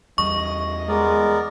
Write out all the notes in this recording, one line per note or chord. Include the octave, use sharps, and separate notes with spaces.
E2 G3 D#5 C#6
G#3 B3 A#4 D5